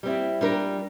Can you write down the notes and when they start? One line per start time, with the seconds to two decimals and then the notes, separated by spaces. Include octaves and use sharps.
0.03 G3 C4 E4
0.41 G3 D4 F4 A#4